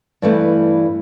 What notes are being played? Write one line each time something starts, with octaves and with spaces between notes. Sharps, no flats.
G2 E3 A3 C4